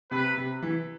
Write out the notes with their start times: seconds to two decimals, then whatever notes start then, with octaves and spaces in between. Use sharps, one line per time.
0.11 C3 B4
0.37 C3
0.62 E3